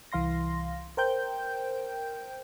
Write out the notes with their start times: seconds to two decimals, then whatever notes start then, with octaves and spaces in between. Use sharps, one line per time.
0.12 C2 E3 F5 C6 A#6
0.97 A#4 C5 G5 G6